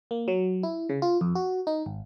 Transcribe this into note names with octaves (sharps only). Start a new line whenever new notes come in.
A#3
F#3
E4
C#3
F4
F2
F#4
D#4
G#1